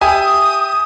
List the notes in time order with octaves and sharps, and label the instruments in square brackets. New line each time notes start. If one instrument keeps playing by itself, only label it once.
[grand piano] G4 E5 G#5 [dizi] D#6